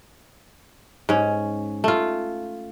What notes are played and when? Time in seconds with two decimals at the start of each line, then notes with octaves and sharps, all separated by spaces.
1.09 G#2 C#4
1.84 A3 F4